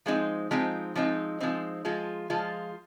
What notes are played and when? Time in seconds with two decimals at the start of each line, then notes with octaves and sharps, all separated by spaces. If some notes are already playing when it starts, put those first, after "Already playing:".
0.06 F3 G#3 C4 D#4
0.51 F3 G#3 C4 D#4
0.95 F3 G#3 C4 D#4
1.40 F3 G#3 C4 D#4
1.85 F3 G#3 F4
2.30 F3 G#3 F4